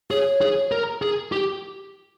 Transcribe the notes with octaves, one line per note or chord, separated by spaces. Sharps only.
G#4 C#5
G#4
A#4
G#4
G4